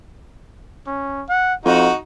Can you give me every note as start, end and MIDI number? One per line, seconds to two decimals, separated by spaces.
0.87 1.24 61
1.29 1.54 78
1.65 1.88 41
1.65 1.94 63
1.65 1.94 66
1.65 1.89 77